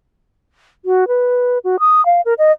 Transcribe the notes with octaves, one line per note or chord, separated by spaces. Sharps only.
F#4
B4
F#4
D#6
F5
A#4
D#5